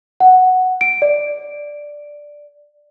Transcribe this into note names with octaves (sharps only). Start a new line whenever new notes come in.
F#5
D7
D5